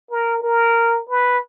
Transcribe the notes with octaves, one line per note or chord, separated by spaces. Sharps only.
A#4
A#4
B4